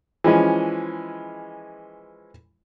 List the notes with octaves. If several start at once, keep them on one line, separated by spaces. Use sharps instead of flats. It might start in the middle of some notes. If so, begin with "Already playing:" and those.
E3 F3 G#3 C#4